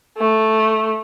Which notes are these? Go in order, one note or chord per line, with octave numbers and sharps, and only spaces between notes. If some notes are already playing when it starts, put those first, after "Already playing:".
A3